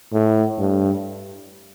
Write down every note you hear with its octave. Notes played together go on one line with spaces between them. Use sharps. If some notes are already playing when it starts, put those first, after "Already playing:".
A2
G2